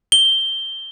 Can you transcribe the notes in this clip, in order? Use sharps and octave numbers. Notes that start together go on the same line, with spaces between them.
G7